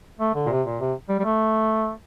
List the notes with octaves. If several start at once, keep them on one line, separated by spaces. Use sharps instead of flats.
A3
D3
A#2
C3
A#2
C3
G3
G3
A3